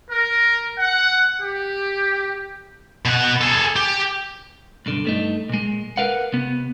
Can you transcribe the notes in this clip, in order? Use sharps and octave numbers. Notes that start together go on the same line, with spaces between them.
A#4
F#5
G4
B2 F#5
G#4 A4
G4
B1 G2 D3
G2 A3 D#4
A#2 G#3
A#4 B4 F5 F#5
C3 B3